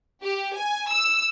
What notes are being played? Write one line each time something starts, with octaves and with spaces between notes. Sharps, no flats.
G4
G#5
E6